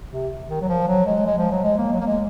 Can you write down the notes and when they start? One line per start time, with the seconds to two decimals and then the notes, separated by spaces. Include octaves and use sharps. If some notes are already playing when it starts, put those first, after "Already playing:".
0.11 C3
0.49 D#3
0.61 F#3
0.69 F3
0.87 F#3
1.06 G#3
1.25 G#3
1.38 F3
1.51 F#3
1.64 G#3
1.78 A#3
1.93 F#3
2.00 A#3
2.06 G#3